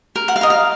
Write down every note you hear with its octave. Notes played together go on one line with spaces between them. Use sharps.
A#4
F#5
F5
A#4 D#5
F5